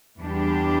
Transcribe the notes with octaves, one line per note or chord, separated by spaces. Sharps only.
E2 D3 G3 D4 G4